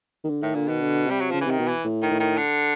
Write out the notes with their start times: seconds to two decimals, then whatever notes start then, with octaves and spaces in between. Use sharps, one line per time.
0.24 D#3
0.30 D3
0.42 A2 D#3
0.55 A#2 D3
0.68 B2 D#3
0.81 D3
1.07 C3 G3
1.20 F#3
1.30 C#3 F3
1.41 E3
1.46 C3 D#3
1.59 B2
1.68 E3
1.85 A2
2.03 D#3
2.11 A2
2.20 D#3
2.37 D3